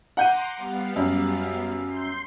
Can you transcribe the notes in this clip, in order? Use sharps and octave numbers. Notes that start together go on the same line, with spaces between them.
F#5 A#5 C6 D6 G6 D#7
G3 B3 F5
F#2
C6 G6 C7